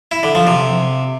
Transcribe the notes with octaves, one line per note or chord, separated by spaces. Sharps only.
E4
D3
F3
C3